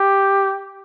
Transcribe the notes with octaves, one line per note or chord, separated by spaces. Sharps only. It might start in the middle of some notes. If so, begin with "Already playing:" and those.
Already playing: G4